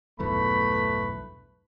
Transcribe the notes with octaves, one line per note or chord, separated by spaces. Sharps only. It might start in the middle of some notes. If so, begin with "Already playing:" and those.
B1 E2 G2 A3 B4 B5